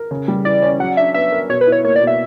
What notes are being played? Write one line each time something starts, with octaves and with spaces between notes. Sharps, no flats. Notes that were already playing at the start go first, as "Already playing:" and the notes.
Already playing: A#4
C#3
G3
E3 D5
C#4
F#3 F#5
D4 E5
B3 E5
A#4
B2 C#5
B4
E4
C#5
A#3 C#5
D5
B2
E5